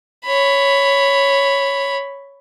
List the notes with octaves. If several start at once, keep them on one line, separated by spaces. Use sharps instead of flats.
C#5 B5